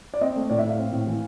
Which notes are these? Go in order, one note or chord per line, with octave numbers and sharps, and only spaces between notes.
D5
C4 D#5
A3
A2 D5
E5
A2
F5
C4
A2
E3